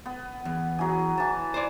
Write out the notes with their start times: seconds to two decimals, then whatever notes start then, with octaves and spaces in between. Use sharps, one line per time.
0.06 B3
0.45 E2
0.79 F#3 E4 G#4
1.17 E3 A5
1.54 C5 D5